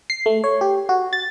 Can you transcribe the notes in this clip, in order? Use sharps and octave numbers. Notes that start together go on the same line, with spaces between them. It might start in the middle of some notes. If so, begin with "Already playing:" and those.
C7
A3
C#5
G4
F#4
A6